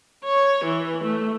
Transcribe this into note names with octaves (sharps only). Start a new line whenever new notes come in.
C#5
E3
A3